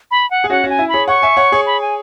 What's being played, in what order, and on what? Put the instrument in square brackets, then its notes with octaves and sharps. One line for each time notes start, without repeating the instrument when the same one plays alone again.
[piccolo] B5
F#5
[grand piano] G#4
[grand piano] C#4 F#4 [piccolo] F#5
[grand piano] C#4 F#4
[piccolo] G#5
[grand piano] E4
[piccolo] B5
[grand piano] G#4 C#5
[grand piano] C#5 F#5 [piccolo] C#6
[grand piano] E5 G#5
C#5 F#5
G#4 C#5
[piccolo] B5
G#5